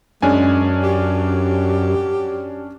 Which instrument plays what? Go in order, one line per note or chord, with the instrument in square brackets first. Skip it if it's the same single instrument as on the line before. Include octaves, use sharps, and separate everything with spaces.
[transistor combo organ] F#2 [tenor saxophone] G#3 [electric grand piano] C#4 D4 G#5
[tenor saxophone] G4